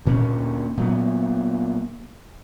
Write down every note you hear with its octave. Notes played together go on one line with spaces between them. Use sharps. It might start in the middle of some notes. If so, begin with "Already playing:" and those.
D2 A#2 C#4
A#2 F#3 B3